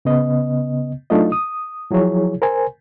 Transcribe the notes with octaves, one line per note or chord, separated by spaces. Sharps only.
C#3 B3 D#5
F#3 A3 D4 D#4 F4 D#5
D#6
F3 F#3 E4 G#4 C#5
A#4 C5 G#5